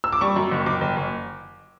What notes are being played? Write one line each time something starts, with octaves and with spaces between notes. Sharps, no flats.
E6
D6
G3 C#6
F#2
F#1
F#1 D6
F#1
F#1